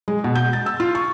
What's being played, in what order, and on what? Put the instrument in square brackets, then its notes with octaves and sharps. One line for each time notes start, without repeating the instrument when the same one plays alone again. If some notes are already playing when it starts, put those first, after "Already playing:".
[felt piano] G#3
B2
G6
A6
E6
F4
C#6